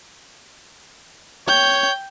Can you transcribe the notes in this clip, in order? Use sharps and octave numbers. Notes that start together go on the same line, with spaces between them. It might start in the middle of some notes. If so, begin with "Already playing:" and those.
C#5 G5 G6